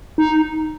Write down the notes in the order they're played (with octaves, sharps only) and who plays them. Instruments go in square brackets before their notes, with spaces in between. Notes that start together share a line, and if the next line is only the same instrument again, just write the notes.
[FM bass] D#4